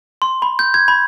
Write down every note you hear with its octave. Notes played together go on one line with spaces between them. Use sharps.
C6
B5
G6
G#6
B5